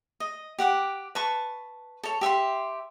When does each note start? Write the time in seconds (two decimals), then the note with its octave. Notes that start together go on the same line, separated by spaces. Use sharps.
0.20 D#5
0.58 G4 F#5 D6
1.15 B4 A5 C#6
2.03 A4 C#5
2.21 G4 E5 F#5 C6